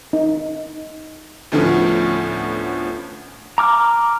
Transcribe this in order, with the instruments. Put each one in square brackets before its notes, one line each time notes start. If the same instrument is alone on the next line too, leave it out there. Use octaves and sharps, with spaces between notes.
[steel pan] D#4
[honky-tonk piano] D2 A2 D3 F3 B3 C#4
[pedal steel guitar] A#5 D6 F6